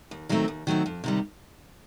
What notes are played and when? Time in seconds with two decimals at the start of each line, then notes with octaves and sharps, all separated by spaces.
0.11 D#2
0.29 D#3 F#3 A3 C4
0.48 D#2
0.67 D#3 F#3 A3 C4
0.86 F2
1.04 C3 D#3 G3